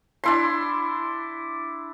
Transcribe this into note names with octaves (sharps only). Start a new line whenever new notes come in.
D4 E4 C6